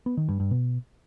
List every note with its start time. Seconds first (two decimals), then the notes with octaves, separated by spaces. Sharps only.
0.06 B3
0.17 D#3
0.29 G2
0.40 G2
0.51 B2